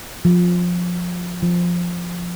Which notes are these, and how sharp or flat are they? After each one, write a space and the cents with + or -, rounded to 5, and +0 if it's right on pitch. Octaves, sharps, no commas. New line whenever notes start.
F3 +20
F3 +5